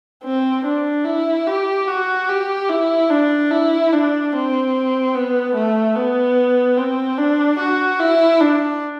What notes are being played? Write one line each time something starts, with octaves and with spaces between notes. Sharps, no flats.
C4
D4
E4
G4
F#4
G4
E4
D4
E4
D4
C4
B3
A3
B3
C4
D4
F#4
E4
D4